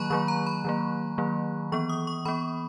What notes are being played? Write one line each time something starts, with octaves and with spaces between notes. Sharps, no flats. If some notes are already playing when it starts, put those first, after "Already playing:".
Already playing: D#3 F#3 A#3 A#5 B5 C#6 F#6
D#3 F#3 A#3 C#6
A#5
B5
D#3 F#3 A#3
D#3 F#3 A#3
E3 B3 C#6
D#6
C#6
E3 B3 B5